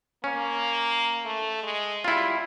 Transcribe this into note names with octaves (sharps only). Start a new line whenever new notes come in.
A#3 C#4
A3
G#3
G3 E4 F4